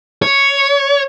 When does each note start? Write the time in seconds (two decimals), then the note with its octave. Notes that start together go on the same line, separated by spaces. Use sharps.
0.22 C#5